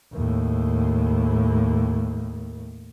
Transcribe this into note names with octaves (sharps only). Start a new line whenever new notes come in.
D#2 A2